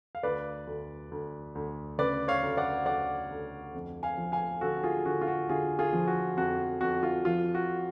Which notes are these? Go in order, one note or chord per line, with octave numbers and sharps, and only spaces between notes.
F5
D2 B4 D5
D2
D2
D2
C#3 B4 D5
C#5 F5
D2
D5 F#5
D2 D5 F#5
D2
F2
F5 G#5
F3
F5 G#5
D3 F#4 A4
F4 G#4
D3 F#4
F4
F#4
D3 F4 G#4
F4 G#4
F3
F#4
F2 F#4
F2 F#4
F4
F3 F4
F#4